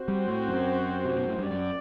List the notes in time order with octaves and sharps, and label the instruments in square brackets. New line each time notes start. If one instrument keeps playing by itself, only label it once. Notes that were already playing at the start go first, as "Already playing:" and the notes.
Already playing: [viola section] C4 F#4 C5
[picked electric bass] G3
A2
F#2
C3
B2
A2
G2
[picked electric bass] F#2 [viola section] D5